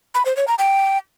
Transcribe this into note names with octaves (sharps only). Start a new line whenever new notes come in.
B5
C5
C#5
A#5
G5